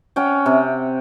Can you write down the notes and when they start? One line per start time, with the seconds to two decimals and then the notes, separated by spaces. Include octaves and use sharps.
0.16 C#4 F#5 G5
0.46 C3